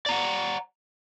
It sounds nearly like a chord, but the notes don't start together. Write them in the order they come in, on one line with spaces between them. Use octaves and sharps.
D5 A#5 F#5